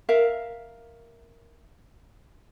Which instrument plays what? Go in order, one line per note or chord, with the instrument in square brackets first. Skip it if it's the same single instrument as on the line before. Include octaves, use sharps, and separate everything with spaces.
[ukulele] A#4 E5 F5